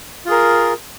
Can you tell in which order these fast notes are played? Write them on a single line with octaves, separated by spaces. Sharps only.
F4 G#4 A#4